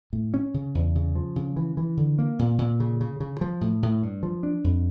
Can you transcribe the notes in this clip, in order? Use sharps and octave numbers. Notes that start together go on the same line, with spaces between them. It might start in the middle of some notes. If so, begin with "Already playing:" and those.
A2
C#4
C#3
E2
C#3
F3
C#3
E3
E3
D3
A#3
A#2
A#2
C#3
C#3
C#3
F3
A2
A2
G2
F3
D4
F2